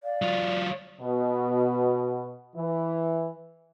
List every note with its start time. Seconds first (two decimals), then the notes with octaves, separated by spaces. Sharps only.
0.04 D5 F5
0.22 F#3 F4
1.01 B2
2.56 E3